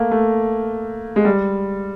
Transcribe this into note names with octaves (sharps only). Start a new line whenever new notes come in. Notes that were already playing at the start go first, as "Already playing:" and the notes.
Already playing: A3 A#3
A3
G#3
G3